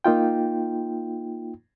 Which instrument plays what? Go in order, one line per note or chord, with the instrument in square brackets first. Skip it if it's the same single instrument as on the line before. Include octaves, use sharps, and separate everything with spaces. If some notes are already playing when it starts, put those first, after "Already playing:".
[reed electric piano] A#3 D#4 F4 G5